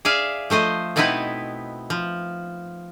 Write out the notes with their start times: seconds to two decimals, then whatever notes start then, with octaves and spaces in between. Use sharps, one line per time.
0.05 G#4 D5 E5 F5
0.50 F3 A3 C5 D#5
0.96 B2 B3 C4 D#4 E4 B4
1.90 F3